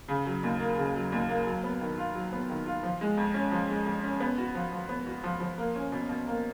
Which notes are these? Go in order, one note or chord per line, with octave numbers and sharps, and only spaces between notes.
C#3
F#3
D#2
A#3
C#3
F#3
D#2
A#3
F#3
B3
D#3
F4
F#3
B3
D#3
F4
F3
G#3
F2
C#4
F3
G#3
F2
C#4
B3
F#4
F3
F3
B3
F#4
F3
F3
A#3
C#4
B2
B2
A#3